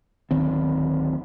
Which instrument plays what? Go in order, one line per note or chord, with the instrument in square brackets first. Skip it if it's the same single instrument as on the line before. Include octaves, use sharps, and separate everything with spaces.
[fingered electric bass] D1 D#3 C4